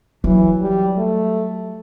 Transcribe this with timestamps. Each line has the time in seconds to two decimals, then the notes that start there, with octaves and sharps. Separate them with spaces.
0.24 E3 F#3
0.61 G3
0.97 A3